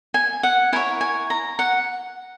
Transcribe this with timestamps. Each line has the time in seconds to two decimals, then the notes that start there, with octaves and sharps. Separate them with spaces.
0.14 G#5
0.43 F#5
0.72 E4 A#4 C#5 G#5
1.01 G#5
1.30 A#5
1.59 F#5